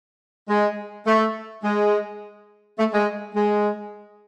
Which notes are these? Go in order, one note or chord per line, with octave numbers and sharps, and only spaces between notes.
G#3
A3
G#3
A3
G#3
G#3